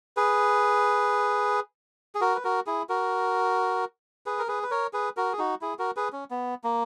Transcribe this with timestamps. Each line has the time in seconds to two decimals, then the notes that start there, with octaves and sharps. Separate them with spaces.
0.17 G#4 B4
2.15 G#4
2.21 F#4 A#4
2.35 B4
2.44 F#4 A#4
2.66 E4 G#4
2.89 F#4 A#4
4.26 G#4 B4
4.39 A#4
4.48 G#4 B4
4.63 B4
4.71 A#4 C#5
4.93 G#4 B4
5.17 F#4 A#4
5.33 G#4
5.39 D#4 F#4
5.61 E4 G#4
5.79 F#4 A#4
5.97 G#4 B4
6.12 C#4
6.31 B3
6.64 A#3